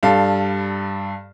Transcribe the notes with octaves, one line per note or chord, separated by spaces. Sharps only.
G2 G3 A4 F5